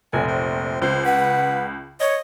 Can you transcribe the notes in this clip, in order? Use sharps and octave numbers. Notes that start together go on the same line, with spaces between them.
F1 A#1 G#5
C5
C#2 C5
B4 F#5
C#5 D#5